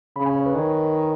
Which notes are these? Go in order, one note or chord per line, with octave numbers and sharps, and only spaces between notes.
C#3 B5
G#5
C#5
B4
D#3 C#5